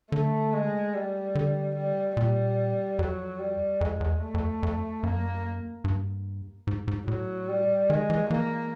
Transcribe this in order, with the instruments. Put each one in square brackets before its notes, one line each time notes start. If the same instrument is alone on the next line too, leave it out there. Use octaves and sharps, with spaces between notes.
[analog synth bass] D3 [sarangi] A3
[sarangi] G#3
G3
[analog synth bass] D3
[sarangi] G3
[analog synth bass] A#2 [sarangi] G3
[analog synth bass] F2 [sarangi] F#3
[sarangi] G3
[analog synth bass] F2 [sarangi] G#3
[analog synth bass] E2
[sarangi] A3
[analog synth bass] F2
F2
[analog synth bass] F#2 [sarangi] A#3
[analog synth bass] G2
G#2
G#2
[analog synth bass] A2 [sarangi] F#3
[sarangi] G3
[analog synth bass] D#3 [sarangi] G#3
[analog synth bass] E3
[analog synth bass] E3 [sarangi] A#3